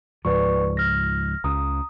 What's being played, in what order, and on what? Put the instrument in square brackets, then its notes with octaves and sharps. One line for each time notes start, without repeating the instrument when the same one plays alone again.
[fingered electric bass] C#2 G#2 F3 [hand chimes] B4 D5 C#6
[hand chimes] F6 A#6
[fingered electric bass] C#2 C#3 [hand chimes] A#5 D#6